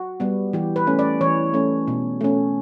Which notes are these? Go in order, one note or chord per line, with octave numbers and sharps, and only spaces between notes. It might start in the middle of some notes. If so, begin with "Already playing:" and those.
Already playing: F#4
G3 B3
E3 G4
B4
A3 C#4
D5
E3 C#5
A3 C#4
B2
A3 C#4